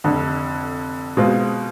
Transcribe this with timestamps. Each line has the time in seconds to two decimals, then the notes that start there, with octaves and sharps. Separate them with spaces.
0.04 F1 F2 D3
1.17 B2 G#3 C4 F4